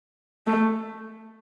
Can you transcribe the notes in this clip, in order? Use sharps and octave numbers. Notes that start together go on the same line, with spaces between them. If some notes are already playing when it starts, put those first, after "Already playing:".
A3